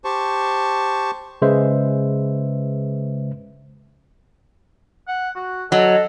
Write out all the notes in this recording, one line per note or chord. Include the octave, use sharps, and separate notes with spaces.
G4 C5 A5 C#6
C#3 G#3 B4 C5 E5
F#5
F#4
F#3 A4 D#5